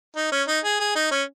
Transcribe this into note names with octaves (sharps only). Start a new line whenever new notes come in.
D#4
C#4
D#4
G#4
G#4
D#4
C#4